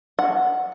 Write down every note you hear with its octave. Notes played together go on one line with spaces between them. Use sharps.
F#5